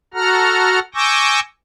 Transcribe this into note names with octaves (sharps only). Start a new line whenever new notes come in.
F#4 A4 F#5 A#5 F6
G#5 C#6 D6 E6 G6 A#6